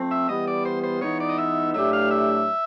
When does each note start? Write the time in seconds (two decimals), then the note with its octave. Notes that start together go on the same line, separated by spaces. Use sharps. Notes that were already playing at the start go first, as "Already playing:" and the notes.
Already playing: F3 A3 C4
0.11 E5
0.29 E3 G3 B3 D#5
0.47 D5
0.65 C5
0.83 C5
1.02 E3 G#3 B3 D#4 C#5
1.20 D5
1.29 D#5
1.38 E5
1.74 A2 F#3 A3 D4 G4 E5
1.93 F5
2.11 E5